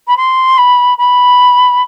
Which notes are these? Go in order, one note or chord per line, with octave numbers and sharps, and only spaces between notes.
B5
C6
B5
B5